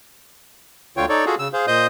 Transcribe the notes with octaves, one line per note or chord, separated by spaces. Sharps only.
D2 D3 F4 C#5 G5
D#4 A4 C#5 D5
F4 F#4 G#4 A4
C#3 E6
G#4 C5 F5
A#2 C5 D#5 D#6 G6